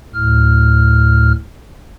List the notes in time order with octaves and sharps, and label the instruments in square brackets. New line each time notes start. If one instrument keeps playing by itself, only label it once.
[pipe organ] D2 A2 F6